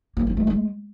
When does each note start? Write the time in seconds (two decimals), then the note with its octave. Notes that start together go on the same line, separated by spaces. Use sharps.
0.17 A#3
0.27 C4
0.37 A3
0.47 G#3